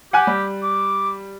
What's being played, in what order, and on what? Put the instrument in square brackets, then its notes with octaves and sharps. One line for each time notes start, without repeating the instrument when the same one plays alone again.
[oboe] G4 [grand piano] F#5 G#5 F#6
[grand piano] G3
[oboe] D6